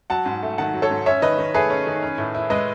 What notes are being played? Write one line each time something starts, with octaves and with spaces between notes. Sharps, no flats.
F#3 F#5 A5
G#2
A3
D#3 F#5 A5
F#3
A4 C#5
G#2
C#4 C#5 E5
D#3 B4 D#5
D#3
A3 G#4 B4
C#4
D#3
C#4
A2
E4
G#3 B4 D#5